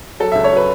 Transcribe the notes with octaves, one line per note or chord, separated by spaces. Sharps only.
F#3 A4
C#2 E5
C#5
F#3 B4